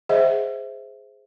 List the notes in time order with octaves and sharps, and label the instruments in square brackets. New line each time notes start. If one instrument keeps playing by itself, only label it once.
[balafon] G#4 C5 D#5 E5 F#5